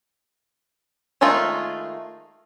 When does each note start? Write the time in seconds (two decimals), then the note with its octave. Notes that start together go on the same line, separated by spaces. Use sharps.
1.21 D#3 G#3 A3 D#4 F4